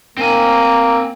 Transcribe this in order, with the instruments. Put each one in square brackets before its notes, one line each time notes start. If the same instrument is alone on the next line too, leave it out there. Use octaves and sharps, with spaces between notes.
[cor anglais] A#3 [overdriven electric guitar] C4 G#5